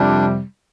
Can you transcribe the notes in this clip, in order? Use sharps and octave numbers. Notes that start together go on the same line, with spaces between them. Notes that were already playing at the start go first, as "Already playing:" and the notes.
Already playing: F2 C3 G3 D4